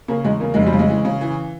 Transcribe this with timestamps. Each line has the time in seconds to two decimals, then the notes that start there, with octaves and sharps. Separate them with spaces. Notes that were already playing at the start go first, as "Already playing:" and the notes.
0.08 C#3 A#3
0.24 E2 G#3
0.40 C#3 A#3
0.54 F1 G#3
0.66 G3
0.73 C#3
0.79 G#3
0.89 E3
1.05 C#3
1.21 E3